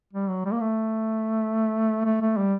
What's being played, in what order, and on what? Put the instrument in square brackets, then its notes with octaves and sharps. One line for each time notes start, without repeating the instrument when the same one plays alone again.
[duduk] G3
F#3
G3
A#3
A3
A3
A3
G3